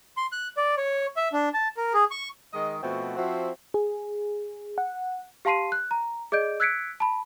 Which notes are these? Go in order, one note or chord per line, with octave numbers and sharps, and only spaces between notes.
C6
F#6
D5
C#5
E5
D4
A5
A#4
G#4
C#6
D#3 G#3 D#5
B2 F3 A3 C4 F#4
F3 C4 E4 F#4
G#4
F#5
G4 F5 A5 C6 C7 D#7
F#6
A#5
G#4 D5 D#5 G6 D7
E6 F#6 G#6 B6 C#7 D7
A5 B5